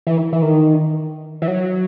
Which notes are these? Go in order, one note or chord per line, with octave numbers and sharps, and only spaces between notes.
E3
E3
D#3
E3
F#3